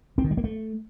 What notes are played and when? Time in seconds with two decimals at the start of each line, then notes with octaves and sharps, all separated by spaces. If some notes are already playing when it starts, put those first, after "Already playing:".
0.18 C4
0.24 D#3
0.31 G3
0.37 A#3
0.44 A3